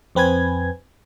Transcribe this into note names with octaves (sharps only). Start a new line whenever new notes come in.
F2 C4 B4 G#5 G#6